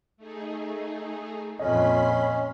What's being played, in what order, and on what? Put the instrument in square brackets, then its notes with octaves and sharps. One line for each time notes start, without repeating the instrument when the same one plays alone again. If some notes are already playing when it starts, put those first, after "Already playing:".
[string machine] A3 D#4 G#4
[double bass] F2 A#2 [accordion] C#4 [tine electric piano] D#5 [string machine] B5 C6 B6